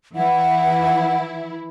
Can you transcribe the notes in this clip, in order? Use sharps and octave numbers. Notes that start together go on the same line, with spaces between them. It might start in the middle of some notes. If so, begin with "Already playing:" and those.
E3 E4 F#5